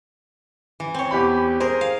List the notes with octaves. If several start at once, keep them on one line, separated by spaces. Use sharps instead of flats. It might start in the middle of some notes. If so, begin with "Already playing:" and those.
E3
C4 C#5
E2 G4 B5
G#4 A#4 C5
F5